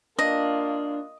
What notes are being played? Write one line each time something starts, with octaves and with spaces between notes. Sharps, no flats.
A#3 D4 F4 D#5